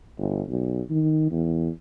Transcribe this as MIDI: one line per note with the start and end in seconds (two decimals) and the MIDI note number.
0.19 0.42 31
0.48 0.81 35
0.90 1.31 51
1.32 1.69 40